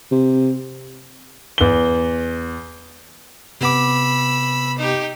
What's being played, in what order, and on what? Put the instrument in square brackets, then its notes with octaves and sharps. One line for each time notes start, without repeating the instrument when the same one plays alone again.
[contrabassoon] C3
[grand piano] E2 G7
[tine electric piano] C3 B3 D6 [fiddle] B5 E6
[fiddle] D#4 G4